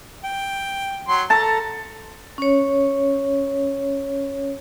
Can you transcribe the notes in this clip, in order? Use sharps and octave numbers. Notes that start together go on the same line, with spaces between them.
G5
F#3 C6
A4 A5 A#5
C#4 C#5